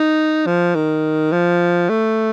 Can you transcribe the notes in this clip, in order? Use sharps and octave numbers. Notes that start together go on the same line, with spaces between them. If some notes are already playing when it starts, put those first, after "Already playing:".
Already playing: D#4
F3
D#3
F3
A3